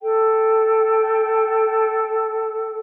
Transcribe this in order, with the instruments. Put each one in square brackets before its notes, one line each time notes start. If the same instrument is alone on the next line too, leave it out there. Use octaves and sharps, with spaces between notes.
[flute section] A4 G5